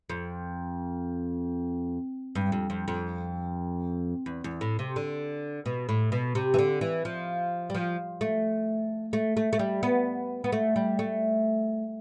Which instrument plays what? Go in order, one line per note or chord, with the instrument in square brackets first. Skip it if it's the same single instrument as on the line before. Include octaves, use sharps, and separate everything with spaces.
[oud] F2
G2
F2
F2
F2
E2
E2
A2
C3
D3
B2
A2
B2
C3
E3
D3
E3
F3
G3
F3
A3
A3
A3
A3
G3
B3
B3
A3
G3
A3